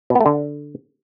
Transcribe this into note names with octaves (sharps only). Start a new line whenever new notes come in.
B2
B3
A3
D3